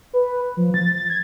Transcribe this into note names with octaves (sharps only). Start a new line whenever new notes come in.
B4
F3
A6
A6
G#6